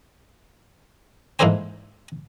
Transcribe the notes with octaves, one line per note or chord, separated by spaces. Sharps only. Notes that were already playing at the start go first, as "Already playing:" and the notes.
G#2 E3 A#3 A4 C5 G#5